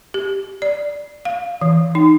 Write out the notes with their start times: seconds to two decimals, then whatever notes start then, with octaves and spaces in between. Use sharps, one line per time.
0.14 G4
0.62 D5
1.25 F5
1.61 E3
1.95 D#4